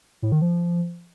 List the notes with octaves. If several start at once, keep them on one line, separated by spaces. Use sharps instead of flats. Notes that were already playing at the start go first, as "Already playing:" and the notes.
A2
D#3
F3